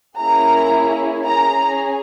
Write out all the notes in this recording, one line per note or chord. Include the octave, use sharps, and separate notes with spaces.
A#3 C#4 E4 G#4 A#5
C#4 G#4 A#5